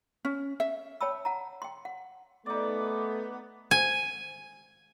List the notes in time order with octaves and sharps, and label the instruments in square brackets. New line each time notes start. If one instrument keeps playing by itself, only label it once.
[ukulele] C#4
E5
[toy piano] C#5 G5 A5 B5 E6
F#5 A5 A#5
G5 C6
F#5
[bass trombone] A3 [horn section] B3 [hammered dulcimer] D#4 D5 [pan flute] D6
[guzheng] G#5